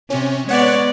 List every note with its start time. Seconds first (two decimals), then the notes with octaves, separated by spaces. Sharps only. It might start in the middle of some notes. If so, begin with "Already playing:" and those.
0.10 C3 C#4
0.48 G#3 B3 C#5 D5 F#5 C#6